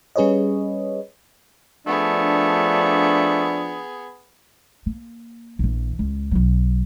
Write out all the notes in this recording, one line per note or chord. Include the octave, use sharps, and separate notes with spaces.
G3 C#4 G#4 B4 C#5 D#5
F3 A3 B3 D4 G#4
A#3
A#1 E3
C#2
B1 F#3